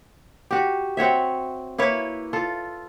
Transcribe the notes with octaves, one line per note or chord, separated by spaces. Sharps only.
F#4 G4
C4 F#4 C#5 E5
A#3 E4 B4 C#5
F4 A4